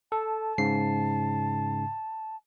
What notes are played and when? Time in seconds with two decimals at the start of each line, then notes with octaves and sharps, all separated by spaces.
0.12 A4 A5
0.58 G#2 C#3 C7